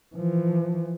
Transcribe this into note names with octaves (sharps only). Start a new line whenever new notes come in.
E3 F3